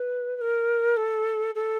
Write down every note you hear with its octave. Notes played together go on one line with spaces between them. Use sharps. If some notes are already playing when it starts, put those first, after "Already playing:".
Already playing: B4
B4
A#4
A4
A4